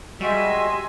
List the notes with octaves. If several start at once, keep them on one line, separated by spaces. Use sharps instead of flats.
G3 G#3 F#4 D#5 E5 G#5 C6